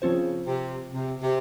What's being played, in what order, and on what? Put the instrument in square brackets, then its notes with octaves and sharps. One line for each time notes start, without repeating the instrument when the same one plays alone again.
[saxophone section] C#3 [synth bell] F3 C4 F4 C5
[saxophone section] C3
C3
C3